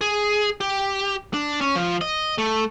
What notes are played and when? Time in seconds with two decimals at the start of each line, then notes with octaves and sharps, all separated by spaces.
0.01 G#4
0.61 G4
1.34 D4
1.61 C#4
1.75 F3
2.01 D#5
2.38 A3